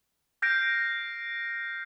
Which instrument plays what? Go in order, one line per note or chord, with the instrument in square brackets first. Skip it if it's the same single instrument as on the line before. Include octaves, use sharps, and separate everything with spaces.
[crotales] F6 G6 A#6 C7 D7